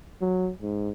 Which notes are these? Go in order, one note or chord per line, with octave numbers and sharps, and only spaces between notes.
F#3
G#2